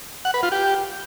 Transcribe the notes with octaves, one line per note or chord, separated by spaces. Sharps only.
F#5
B4
F4
G4